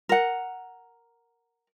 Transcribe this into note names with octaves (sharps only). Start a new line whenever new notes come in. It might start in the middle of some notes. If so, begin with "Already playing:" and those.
A#4 F#5